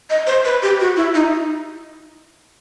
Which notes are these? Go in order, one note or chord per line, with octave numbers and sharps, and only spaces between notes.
D#5
C5
B4
G4
F#4
E4
D#4